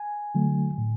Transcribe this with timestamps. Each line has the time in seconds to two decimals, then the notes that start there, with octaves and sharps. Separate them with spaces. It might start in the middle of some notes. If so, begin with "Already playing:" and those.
Already playing: G#5
0.35 D3 F#3 A3
0.78 A2